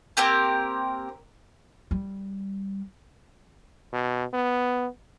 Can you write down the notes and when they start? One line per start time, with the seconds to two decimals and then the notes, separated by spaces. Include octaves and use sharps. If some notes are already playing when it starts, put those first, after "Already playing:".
0.17 A#3 C4 G4 A#4
1.91 G3
3.93 B2
4.33 B3